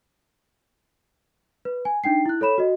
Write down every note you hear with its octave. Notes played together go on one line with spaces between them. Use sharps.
B4
G#5
D4 D#4 G5 C7
E4 F#6
A4 C#5 B5 E7
F#4 D#5